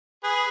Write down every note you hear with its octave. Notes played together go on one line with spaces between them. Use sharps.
G#4 B4